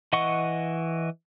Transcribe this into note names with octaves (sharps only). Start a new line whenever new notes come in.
E3 D#5 F#5 C#6